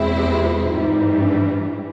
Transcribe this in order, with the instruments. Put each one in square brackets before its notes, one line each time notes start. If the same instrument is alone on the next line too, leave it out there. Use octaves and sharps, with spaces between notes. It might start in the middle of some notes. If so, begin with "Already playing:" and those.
Already playing: [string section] E2 B2 G#3 C4 E4
[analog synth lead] G4
F4
D4
[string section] G#2 E3 G3 [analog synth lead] D#4
[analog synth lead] C#4
D4